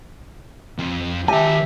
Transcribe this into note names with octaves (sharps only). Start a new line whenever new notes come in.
F2
D#3 G4 E5 G#5 A5